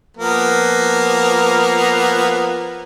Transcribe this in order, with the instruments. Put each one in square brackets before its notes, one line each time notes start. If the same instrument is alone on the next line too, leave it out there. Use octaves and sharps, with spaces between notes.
[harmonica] F3 A#3 B3